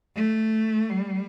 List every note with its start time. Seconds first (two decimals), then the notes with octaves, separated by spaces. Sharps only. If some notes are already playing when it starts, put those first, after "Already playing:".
0.16 A3
0.90 G3